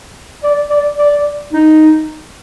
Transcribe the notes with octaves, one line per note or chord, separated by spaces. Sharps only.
D5
D5
D5
D#4